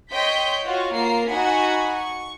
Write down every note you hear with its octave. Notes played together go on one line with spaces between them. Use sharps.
C#5 D#5 G5 C6 G6 B6
F4 F#4 C#5 F5
A#3 F4 A#5 C7
D#4 F#4 F#5 G#5 B5
C#6